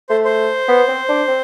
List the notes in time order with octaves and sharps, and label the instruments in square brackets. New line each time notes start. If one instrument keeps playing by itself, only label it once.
[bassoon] A3 [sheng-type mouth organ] C5
[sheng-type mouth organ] C5
[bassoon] B3
C4
D4
C4